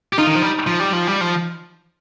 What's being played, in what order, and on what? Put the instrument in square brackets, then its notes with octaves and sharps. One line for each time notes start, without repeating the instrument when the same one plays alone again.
[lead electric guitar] G4
[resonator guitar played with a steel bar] D#4 [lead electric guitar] F4
[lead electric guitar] D#3
F3
G3
F3
G3
F3
G3
F3